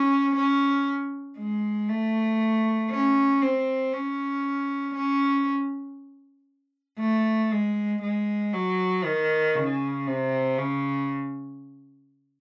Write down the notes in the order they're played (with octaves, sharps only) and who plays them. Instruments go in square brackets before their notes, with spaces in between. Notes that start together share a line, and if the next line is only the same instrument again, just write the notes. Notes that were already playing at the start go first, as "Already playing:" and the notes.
Already playing: [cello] C#4
C#4
G#3
A3
C#4
C4
C#4
C#4
A3
G#3
G#3
F#3
D#3
C#3
C3
C#3